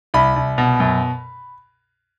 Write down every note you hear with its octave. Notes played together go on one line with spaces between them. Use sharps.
C2 B5
C2
B2
F#2